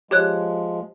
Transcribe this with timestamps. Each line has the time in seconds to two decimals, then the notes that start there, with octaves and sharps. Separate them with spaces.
0.11 F3 G#3 G4 C#5 F#6